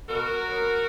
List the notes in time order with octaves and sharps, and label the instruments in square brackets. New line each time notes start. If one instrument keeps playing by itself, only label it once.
[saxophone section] B2 F#4 A#4
F#3 B3